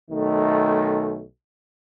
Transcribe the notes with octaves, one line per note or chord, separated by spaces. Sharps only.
B1 D#3 A3